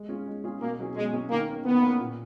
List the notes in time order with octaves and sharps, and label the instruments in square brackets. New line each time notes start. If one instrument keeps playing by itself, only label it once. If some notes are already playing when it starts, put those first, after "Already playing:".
Already playing: [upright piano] G#3
C#4 F4 G#4
G#3
C#4 F4 G#4
[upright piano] B2 [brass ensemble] A#3
[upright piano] F#3 C#4 G#4
[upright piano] B2 [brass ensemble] G#3
[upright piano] F#3 C#4 G#4
[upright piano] D#3 [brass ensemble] A#3
[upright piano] A#3 C#4
[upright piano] D#3 [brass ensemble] B3
[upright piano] A#3 C#4
A#2